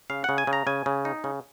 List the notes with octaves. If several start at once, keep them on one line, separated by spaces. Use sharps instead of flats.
C#3 F5
C#3 F#5
G#5
C#3
A#5
C#3 G#5
C#3
D#4
C#3